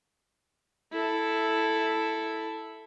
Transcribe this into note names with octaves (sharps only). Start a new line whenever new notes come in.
E4 A4